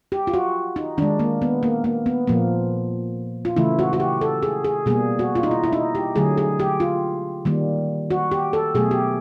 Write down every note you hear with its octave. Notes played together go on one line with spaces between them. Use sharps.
G4
F4
F#4
D#4
D#3 G#3 D4
A#3
B3
A#3
A#3
B3
A#2 F3 A#3
F4
C#3 E3 A3 E4
F#4
F#4
G4
A4
G#4
G#4
B2 G3 A#3 G#4
F#4
F4
D#4
E4
E4
D#4
G4
D3 F#3 A3 G#4
G#4
G4
F4
D#3 G3 A#3
F#4
G4
A4
B2 F#3 A3 G#4
G4